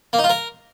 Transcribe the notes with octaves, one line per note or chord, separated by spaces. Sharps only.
A#3
D#4
F4
A#4